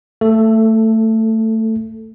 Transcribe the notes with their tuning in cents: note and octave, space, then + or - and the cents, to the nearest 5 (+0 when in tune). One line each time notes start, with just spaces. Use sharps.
A3 +20 A4 +0